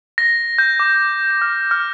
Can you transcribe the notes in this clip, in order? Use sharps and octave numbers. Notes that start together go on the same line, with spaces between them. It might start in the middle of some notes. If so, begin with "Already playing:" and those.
A#6
G6
D6
G6
F6
F6